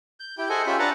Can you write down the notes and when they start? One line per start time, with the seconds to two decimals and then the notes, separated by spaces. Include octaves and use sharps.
0.20 G6
0.38 E4 G4 G5
0.50 G#4 A4 C5 D#5 F#5 G#5
0.67 C#4 F4 G4 E5 B5
0.79 D4 B4 F#5 A5 A#5